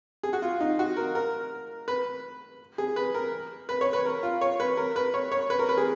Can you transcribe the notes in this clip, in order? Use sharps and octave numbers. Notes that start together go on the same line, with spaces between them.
G#4
F#4
F4
D#4
F#4
A#4
A#4
B4
G#4
B4
A#4
B4
C#5
B4
A#4
F4
C#5
B4
A#4
B4
C#5
C#5
B4
A#4
B4
G#4